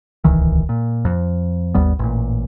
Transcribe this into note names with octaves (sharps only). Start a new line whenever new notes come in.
D1 C2 D#3 E3
A#2
F2
G#1 D#2 G3 B3
A1 A#2